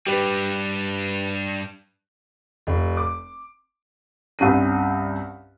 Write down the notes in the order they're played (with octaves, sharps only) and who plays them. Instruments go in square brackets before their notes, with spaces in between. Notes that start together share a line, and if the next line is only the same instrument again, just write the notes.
[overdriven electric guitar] G2 G3 [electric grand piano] G4 B4
[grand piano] F1
D6
[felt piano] C2 G2 C#4 D#7